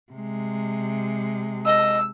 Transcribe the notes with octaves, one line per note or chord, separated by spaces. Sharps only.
C3 G#3
D#5 E6